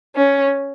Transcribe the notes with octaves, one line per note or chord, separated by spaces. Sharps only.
C#4